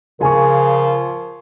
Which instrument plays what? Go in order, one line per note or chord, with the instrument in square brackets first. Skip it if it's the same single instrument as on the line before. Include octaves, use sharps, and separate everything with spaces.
[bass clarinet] C#3 [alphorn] F3 [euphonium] A#4 [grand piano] G#5 C#6